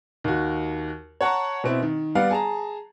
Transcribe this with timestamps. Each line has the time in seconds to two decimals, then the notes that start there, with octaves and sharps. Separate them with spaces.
0.24 D#2 F#4
1.21 C#5 F#5 A5 A#5 C#6
1.64 B2 C4 E4
1.82 D#3
2.15 G3 B3 D5 F5 F#5
2.30 G#4 A5 A#5